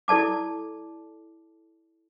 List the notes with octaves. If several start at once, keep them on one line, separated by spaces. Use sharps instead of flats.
E4 A4 D5 A5 D6